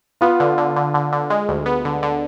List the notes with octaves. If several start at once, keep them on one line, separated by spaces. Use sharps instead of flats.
B3 F4
D3
D3
D3
D3
D3
G#3
D2
B3
D3
D3